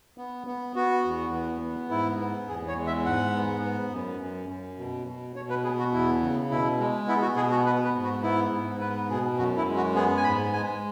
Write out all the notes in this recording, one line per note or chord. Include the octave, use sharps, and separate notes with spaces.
B3
B3
B3 F#4
E2
B3
B3
G#2 E4
B3
E2 G#4
C#5
G#3
E5
G#2 F#5
B3
B3
F#2
F#2
F#2
B2
B2
B2 C#5
B4
B3 G#4
F#4
E2 E4
C#3
B2 E4
G#3
B3 E4
F#4
B2 G#4
F#4
B3 B4
B4
G#2
F#4
B3 E4
G#2
B3 B4
B2 G#4
F#2 F#4
E4
G#3
F#4
B3 G#4
G#5
G#2 B5
G#3 G#5